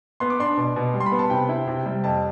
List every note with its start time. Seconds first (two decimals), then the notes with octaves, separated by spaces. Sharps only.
0.20 B3 C6
0.30 D6
0.40 D4 C6
0.57 B2
0.76 B2
0.94 G3
1.00 C6
1.06 B5
1.12 B3
1.19 A5
1.30 C3 G5
1.49 E4
1.67 C3
1.86 G3
2.04 F2 A5